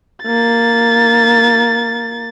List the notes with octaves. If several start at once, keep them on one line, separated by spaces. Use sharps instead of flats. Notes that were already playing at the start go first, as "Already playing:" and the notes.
A#3 A6